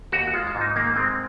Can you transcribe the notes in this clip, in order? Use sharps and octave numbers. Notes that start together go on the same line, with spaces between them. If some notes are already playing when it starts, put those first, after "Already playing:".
D#2 F#4
G#3 F4
F4
G#2
D#4
D#3 A#3
G#3 C4